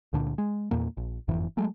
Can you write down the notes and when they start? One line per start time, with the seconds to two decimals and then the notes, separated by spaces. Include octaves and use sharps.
0.13 C#2 A#2 D3 D4
0.38 G#3
0.71 E2 A#2 A#3
0.97 A#1
1.28 F#1 F2 G#2 E3
1.57 F#3 G#3 A3